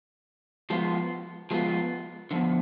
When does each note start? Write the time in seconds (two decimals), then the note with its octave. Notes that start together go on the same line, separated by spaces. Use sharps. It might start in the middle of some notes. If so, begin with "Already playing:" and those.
0.70 F3 G#3 B3 F4
1.51 F3 G#3 B3 F4
2.31 D3 F3 B3